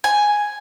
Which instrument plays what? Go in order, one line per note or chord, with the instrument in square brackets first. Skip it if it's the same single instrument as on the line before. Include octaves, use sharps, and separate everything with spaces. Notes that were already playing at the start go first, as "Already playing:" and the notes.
[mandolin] G#5